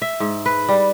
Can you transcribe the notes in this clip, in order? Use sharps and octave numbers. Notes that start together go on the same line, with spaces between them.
E5
G#2
B4
G3